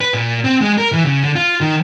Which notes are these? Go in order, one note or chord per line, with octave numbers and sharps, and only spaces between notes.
B4
A#2
C4
G#3
A#4
E3
C#3
D3
F4
D#3